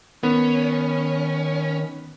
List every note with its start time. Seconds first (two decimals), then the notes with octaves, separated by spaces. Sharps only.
0.23 D#3 B3 C#4